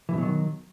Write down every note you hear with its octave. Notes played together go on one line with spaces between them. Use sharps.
B2 D#3 E3 F#3